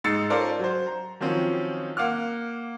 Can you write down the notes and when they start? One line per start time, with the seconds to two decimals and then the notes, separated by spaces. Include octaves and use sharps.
0.04 G#2 D#4 E6 A6 C7 C#7
0.30 C#4 F4 A4 A#4 C5 D5
0.59 F#3 C5
0.87 A#5
1.20 D#3 F3 F#3 C4 C#4
1.97 A#3 F#5 D6 F6